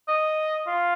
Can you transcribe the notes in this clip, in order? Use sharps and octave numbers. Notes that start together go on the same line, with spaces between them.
D#5
F4